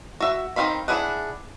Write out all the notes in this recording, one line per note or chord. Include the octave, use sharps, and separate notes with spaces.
F#4 E5
D#3 F#3 C4 F5 B5
D4 E4 G#4 F#5